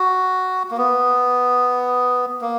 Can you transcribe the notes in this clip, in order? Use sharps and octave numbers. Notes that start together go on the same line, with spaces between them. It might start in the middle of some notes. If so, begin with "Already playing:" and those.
Already playing: F#4
A#3
B3
A#3